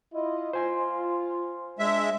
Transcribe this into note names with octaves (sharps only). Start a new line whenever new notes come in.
E4 F4 D#5
F4 C5 G#5 C6
G#3 D4 E5